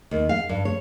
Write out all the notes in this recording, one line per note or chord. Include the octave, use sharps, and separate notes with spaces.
D#2
F5
G2
C#5